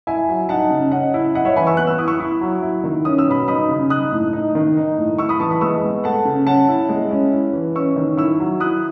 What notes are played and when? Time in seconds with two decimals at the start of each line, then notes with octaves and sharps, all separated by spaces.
0.07 E4 E5 G#5
0.29 F#3
0.49 D#4 F#5 A5
0.70 C#3
0.91 C#4 D#5 F#5
1.14 E4
1.34 E4 D#5 F#5
1.45 C#5 E5
1.56 E3 G#5 B5
1.67 C#6 E6
1.77 B3 F#6
1.87 E6
1.98 E4 D#6
2.08 C#6 E6
2.20 E4
2.41 F#3
2.63 E4
2.84 D#3
3.05 C#4 D#6
3.19 E6
3.27 B2 B5 D#6
3.48 D#4 B5 D#6
3.69 C#3
3.90 D#4 D#6 F#6
4.12 A2
4.33 D#4
4.55 D#3
4.77 D#4
4.98 A2
5.18 E4 C#6 E6
5.29 B5 D#6
5.40 E3 A5 C#6
5.50 B5 D#6
5.61 G#3 C#6 E6
5.83 B3
6.04 A3 F#5 A5
6.25 C#3
6.47 C#4 F#5 A5
6.69 E4
6.89 G#3
7.11 C#4
7.32 E4
7.53 E3
7.75 C#4 C#6 E6
7.96 D#3
8.17 E4 C#6 E6
8.40 F#3
8.60 E4 D#6 F#6